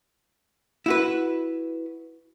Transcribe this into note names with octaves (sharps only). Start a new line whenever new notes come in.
E4 F#4 B4